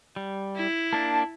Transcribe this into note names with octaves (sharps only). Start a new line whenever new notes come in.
G3
E4
A#3 D4 A5